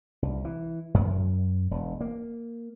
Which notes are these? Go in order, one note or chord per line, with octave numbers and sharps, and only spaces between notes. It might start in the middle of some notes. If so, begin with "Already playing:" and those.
C2
E3
F#2
E1
A#3